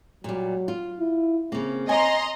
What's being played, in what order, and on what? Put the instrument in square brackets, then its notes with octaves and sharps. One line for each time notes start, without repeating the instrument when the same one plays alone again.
[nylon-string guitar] A#2 G3 [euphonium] F#3
[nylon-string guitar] F4
[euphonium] E4
[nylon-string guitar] C#3 A#3 [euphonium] C4
[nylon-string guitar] C#5 G#5 [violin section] D#5 A#5 C6